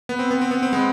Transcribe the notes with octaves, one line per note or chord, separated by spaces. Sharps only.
B3
C4
B3
C4
B3
C4
G#3 B3